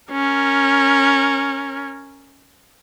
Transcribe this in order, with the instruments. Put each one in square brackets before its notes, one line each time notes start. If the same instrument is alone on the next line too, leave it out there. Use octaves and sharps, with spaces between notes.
[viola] C#4 A#4